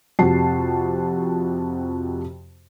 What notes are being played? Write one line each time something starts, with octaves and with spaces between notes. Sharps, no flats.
F2 C3 F#4 G4 A5 C7